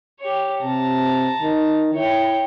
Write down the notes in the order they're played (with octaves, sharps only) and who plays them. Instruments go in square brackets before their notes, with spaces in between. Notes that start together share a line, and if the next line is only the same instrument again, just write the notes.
[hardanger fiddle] G4 C#5
[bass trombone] C3 [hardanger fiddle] A5 A#5
[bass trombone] D#3
[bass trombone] E4 [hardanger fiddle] C#5 G5